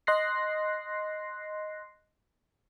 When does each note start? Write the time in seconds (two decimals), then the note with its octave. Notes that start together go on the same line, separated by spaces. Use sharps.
0.07 D#5 C6 F#6 A#6 C7